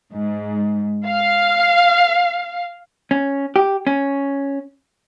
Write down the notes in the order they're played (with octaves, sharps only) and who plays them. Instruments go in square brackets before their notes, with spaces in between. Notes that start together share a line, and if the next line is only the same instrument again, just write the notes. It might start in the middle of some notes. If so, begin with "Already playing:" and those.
[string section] G#2
F5
[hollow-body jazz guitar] C#4
G4
C#4